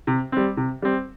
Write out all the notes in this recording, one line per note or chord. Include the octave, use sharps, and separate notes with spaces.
C3
G3 C4
C3
G3 C4